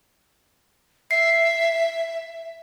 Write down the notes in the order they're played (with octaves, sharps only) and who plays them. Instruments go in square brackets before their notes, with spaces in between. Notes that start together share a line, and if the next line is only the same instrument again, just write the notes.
[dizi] E5 [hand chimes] C7